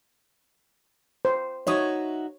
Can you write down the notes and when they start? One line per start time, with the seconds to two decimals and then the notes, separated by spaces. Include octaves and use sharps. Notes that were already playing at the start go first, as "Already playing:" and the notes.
1.25 C5
1.67 D#4 F#4 C#5 E5 D#6